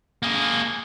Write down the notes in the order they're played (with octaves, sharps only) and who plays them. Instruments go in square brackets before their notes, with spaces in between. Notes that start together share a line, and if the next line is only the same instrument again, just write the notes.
[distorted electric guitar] A#3 G#4